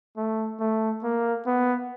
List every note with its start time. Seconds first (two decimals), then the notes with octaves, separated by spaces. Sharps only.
0.17 A3
0.60 A3
1.03 A#3
1.46 B3